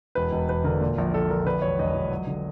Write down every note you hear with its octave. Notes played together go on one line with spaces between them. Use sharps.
E1 B4
E1
E1 B4
D3 A#4
A#2
A#1
A#1 A4
A#1 A#4
D3 B4
E1 C#5
E1 D#5
E1
F#3
D3